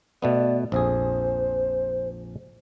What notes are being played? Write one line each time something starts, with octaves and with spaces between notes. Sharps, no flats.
B2 A3 B3 D5
A#1 F2 G#4 C5